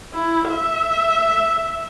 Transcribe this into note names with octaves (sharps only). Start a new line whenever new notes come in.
E4
E5